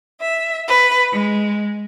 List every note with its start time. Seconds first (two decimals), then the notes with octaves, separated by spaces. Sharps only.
0.20 E5
0.66 B4
1.13 G#3